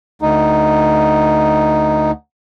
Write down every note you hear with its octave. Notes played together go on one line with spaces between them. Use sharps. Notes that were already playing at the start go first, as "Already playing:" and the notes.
D2 D#4